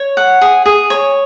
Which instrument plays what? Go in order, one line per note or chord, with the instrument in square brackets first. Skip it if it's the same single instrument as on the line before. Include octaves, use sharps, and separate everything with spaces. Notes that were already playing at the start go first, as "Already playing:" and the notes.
Already playing: [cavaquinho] C#5
F#5
G#4
G#4
C#5